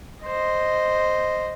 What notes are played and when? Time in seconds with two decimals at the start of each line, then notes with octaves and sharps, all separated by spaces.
0.24 C5 D#5